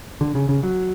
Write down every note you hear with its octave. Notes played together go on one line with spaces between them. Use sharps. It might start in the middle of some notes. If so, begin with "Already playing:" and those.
D3
C#3
C#3
F#3